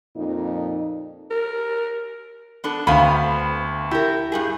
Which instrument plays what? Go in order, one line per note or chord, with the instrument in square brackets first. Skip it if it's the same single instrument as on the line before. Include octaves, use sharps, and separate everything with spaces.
[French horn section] F2 A#2 D#4
[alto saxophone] A#4
[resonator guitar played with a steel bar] B3 D4 A4
[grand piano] D2 B5 [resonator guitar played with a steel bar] B3 C4 F5
[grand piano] E4 [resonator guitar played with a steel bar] G4 A#4
[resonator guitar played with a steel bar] G2 G3 G#4